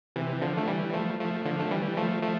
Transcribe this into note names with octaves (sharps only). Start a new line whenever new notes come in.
C3 E3
D3 F3
A3
E3 G3
F3 A3
F3 A3
D3 F3
A3
E3 G3
F3 A3
F3 A3